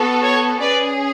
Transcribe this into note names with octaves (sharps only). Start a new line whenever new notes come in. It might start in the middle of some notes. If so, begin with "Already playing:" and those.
Already playing: B3 F#4 A4
C#5
C#4 G#4 B4 D5